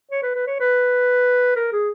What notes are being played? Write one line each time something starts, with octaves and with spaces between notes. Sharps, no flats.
C#5
B4
B4
C#5
B4
A#4
G#4